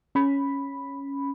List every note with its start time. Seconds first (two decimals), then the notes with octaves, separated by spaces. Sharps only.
0.15 C#4 B5